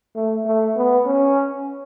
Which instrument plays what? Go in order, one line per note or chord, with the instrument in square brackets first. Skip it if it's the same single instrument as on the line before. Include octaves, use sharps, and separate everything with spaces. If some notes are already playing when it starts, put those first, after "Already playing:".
[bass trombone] A3
A3
B3
C#4